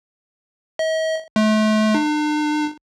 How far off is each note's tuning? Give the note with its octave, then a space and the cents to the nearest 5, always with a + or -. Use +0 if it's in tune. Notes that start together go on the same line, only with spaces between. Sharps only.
D#5 +45
A3 -35
D4 +45